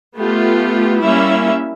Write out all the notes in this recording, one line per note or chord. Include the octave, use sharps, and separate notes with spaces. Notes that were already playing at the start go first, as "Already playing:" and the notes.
A3 B3 F4 G4
G3 A#3 C#4 E4 E5